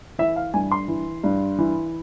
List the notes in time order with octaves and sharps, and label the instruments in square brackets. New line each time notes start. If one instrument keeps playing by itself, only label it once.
[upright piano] E3 E5
F5
G2 G#5
C6
E3
G2
E3